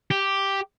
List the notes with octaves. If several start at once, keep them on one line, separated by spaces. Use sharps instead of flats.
G4